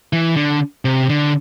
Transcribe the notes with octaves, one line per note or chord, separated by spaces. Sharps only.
E3
D3
C3
D3